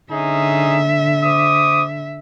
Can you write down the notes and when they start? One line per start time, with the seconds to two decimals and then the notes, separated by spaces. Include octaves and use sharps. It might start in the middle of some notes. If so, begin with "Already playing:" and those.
0.12 D3 C#4 D#4 G#4 E5
1.24 C5 D6 D#6